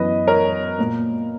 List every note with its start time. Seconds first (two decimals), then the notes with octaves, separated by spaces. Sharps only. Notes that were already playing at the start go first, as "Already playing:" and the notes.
Already playing: F#2 E3 B3 B4 D#5
0.27 A#4 C#5
0.78 A#2 A#3